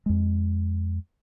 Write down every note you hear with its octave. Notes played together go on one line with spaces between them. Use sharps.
F2 G#3